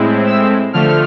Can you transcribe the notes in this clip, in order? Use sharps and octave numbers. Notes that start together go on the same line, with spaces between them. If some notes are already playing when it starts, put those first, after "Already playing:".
Already playing: A2 G#3 C4 E4
E6
D3 F3 A3 F6